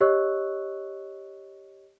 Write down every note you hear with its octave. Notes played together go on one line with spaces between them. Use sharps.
G4 C#5 D#5 C#6 E6 F#6